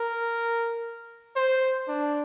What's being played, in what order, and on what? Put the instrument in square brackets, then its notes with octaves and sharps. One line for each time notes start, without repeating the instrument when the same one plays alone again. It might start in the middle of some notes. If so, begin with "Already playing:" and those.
Already playing: [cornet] A#4
C5
D4